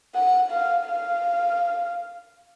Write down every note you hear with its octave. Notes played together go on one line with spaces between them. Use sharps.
F#5
F5
F5